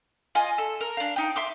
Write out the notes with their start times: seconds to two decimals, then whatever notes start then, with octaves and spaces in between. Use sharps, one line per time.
0.35 F4 D#5 G#5
0.58 A4
0.81 A#4
0.97 D4 F5
1.16 D#4 G5
1.36 E5 C6 D6